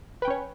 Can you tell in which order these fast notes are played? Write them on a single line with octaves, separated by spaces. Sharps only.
B4 G5 C#4 C#5